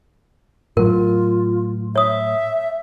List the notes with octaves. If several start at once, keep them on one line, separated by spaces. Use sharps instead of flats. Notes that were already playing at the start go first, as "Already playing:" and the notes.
A2 F#3 F4 A#4
C#5 E5 D#6